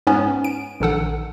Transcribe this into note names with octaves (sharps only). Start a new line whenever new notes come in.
G#2 B3 C#4
D7
A#1 D#3 A4 F#5